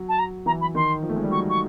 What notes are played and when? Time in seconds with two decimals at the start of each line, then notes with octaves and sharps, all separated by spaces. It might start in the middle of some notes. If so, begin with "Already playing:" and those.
Already playing: F#3
0.08 A5
0.18 A#5
0.46 E3 A#5
0.61 B5
0.75 D#3 C6
1.03 F3
1.09 A3
1.16 G#3
1.23 G3
1.31 F#3 C#6
1.49 C#6